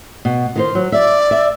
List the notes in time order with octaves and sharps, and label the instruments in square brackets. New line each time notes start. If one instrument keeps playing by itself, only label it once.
[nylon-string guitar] B2
D#3 F4 C5
F#3
[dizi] D5 [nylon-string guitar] E5
[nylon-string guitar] E5